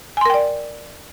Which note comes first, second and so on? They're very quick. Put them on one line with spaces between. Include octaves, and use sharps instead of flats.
G#5 C6 A#4 G5 D5